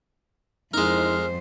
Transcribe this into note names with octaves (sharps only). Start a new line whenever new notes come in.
F2 G#3 D#4 E4 A#4 C5 F6